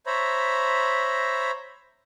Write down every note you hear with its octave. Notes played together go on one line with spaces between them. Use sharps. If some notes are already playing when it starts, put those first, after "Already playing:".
C5 C#5 E5 A#5 B5